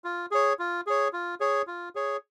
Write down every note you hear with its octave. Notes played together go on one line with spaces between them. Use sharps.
F4
G#4 C#5
F4
G#4 C#5
F4
G#4 C#5
F4
G#4 C#5